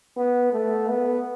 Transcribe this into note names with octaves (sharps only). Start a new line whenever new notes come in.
B3
A3
B3